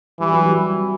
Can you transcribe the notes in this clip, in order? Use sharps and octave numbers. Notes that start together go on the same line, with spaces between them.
E3 G3
F#3
G3